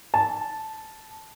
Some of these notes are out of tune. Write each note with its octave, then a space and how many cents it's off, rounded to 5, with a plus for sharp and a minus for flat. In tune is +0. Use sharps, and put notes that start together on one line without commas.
A5 -5